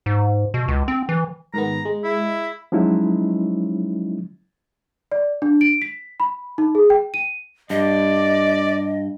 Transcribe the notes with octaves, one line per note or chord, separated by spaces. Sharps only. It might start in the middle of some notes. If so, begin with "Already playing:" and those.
G#2
B2
C#2
C4
E3
G#2 D#3 B3 A#5
G#3
E4
F3 F#3 G#3 C#4 D#4 E4
D5
D4
D7
B6
B5
D#4
G#4
G5
D#7
G2 D5 D#5